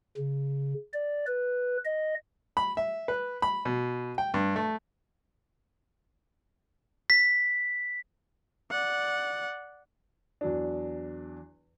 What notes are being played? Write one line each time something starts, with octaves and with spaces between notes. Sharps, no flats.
C#3
D5
B4
D#5
B5
E5
B4
B5
B2
G5
G2
A3
B6
D5 F#5
E2 F#3 D4